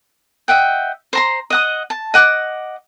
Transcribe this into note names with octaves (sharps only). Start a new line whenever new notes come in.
D#5 E5 F#5 G5
C5 A#5 C6
D#5 F#5 D#6
A5
D#5 F#5 D6